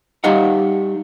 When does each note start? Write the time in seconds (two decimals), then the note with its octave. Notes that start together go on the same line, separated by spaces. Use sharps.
0.24 G3 D#4 G4 D#5 F5 F#5